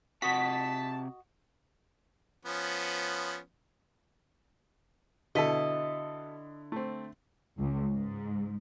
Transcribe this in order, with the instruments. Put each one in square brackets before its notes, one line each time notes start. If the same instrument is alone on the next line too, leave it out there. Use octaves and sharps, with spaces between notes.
[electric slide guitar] C3 F#5 [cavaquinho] F#4 D#5 [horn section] A5 [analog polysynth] B6
[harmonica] F3 B3 C#4
[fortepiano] B2 A4 [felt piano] D3 E4 B6 [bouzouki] D#5
[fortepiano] A3 C4
[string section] C#2
G#2